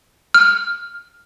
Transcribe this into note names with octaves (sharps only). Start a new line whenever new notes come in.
F6